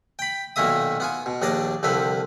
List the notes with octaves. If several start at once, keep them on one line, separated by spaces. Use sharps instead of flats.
G5 B5
B1 A#2 D#3 A#3 E5 D#6
B3 F4 G#5
B2
A#1 D#2 D4 D5 D#5 A5
C2 D3 F3 C4 B4